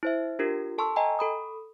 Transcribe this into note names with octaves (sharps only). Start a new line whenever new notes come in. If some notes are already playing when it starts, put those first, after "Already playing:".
E4 C5 E5
D4 F4 G4 A#4
A4 A5 C6 C#6 E6
D#5 G5 G#5 A#5
A4 B5 D#6